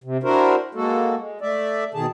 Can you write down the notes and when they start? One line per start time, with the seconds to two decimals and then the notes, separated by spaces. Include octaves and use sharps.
0.04 C3
0.23 D4 E4 F#4 A#4 C5
0.75 G#3 A#3 F#4 A4
1.19 G#3
1.41 A3 D5 E5
1.94 B2 D#3 G#4 A5